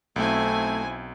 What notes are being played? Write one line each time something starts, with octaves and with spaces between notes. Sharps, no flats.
B1 A3 C4 E4 G#5